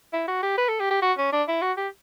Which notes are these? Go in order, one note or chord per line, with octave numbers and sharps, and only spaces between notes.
E4
F#4
G4
B4
A4
G4
G4
F#4
C#4
D4
E4
F#4
G4